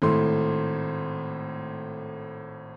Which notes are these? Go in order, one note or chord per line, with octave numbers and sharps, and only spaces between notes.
G#1 A2 A3 C6